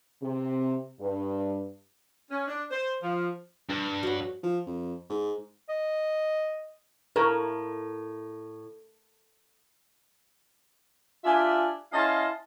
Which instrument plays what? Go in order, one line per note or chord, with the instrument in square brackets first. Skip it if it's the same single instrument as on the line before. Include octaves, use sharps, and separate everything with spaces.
[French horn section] C3
G2
[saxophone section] C#4
D4
C5
F3
[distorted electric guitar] G2
[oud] F#4 C#5
[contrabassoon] F3
F2
G#2
[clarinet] D#5
[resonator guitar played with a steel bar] A2 [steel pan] A#4
[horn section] D4 F4 G4 E5 G#5
C#4 E4 D#5 F5 A5 C6